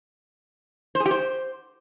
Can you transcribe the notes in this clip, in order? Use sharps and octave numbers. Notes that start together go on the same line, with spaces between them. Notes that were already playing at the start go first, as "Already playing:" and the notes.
C5
G#4
G4
C5